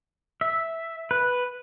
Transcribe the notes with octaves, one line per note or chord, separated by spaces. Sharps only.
E5
B4